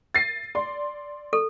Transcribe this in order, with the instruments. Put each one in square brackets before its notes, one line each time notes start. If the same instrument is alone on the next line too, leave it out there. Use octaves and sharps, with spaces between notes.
[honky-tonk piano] A6 C7 D#7
D5 C6
[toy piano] A4